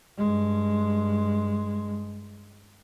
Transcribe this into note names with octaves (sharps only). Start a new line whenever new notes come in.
G2 G#3